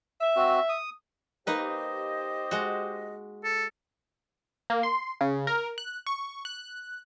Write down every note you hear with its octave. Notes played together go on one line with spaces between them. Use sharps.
E5
C4 F#4
D#6
A#3 D#4 G4 B4 C5 D#5
G#3 F#4
A4
A#3
C6
C#3
A#4
F#6
C#6
F#6